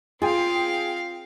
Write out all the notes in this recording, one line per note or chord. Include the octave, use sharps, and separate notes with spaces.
C4 F4 G#4 F5 G5